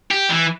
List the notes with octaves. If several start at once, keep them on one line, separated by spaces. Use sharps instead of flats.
G4
E3